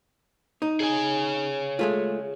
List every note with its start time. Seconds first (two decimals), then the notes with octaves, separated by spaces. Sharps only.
0.62 D#4
0.80 G#4 C#5 G#5
1.79 G#3 A3 F4